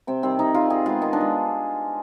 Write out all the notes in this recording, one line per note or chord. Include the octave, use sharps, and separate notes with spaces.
C3 C4
D#3 G3 C4
C3 D#4
D#3 G3 F4
D#3 G#4
G#3 B3 F4
D#3 D#4
D4
G#3 B3